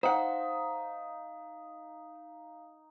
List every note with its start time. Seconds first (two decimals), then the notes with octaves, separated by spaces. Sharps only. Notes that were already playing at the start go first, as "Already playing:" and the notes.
0.03 D#4 C5 F5 F#5